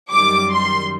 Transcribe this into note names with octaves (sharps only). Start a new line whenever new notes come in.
F#2 D#3 G3 D6
C6